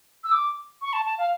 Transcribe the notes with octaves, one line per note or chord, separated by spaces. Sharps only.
E6
D6
C#6
A5
A5
F5